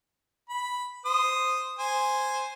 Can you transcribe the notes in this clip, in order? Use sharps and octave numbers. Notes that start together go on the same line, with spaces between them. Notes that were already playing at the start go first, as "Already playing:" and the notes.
B5
C5 D#6
C5 G#5